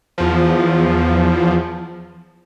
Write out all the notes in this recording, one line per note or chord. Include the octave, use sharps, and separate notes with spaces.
E2 F3